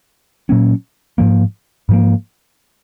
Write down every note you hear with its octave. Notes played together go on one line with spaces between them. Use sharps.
A#2 F#3 A#3 C#4
G#2 F3 A#3
G#2 F3 A#3